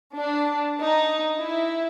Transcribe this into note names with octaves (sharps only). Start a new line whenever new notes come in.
D4
D#4
E4